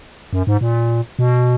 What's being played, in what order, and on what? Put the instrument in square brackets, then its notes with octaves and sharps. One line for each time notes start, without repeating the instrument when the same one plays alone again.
[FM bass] F#2
G#2
A#2
B2